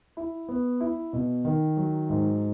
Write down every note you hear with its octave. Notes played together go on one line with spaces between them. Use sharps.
E4
B3
E4
B2
D#3
F#3
G#2